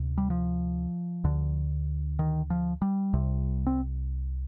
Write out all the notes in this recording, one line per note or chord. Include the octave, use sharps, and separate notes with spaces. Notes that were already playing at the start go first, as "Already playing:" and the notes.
Already playing: D2 C3
G3
F3
D2 D3
D#3
F3
G3
C2 C3
C4